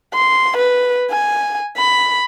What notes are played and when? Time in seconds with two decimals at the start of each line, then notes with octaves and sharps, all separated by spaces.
0.14 C6
0.57 B4
1.11 G#5
1.77 B5